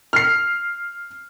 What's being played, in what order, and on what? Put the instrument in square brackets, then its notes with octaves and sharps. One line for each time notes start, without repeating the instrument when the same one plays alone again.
[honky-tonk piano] F6 C7